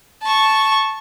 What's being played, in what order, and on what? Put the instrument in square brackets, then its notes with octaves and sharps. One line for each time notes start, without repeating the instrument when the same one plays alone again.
[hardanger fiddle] A5 C#6